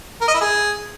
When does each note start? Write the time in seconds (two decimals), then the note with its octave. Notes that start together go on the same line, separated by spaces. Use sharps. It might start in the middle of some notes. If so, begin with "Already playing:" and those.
0.21 A#4
0.28 D#5
0.34 E4
0.41 G#4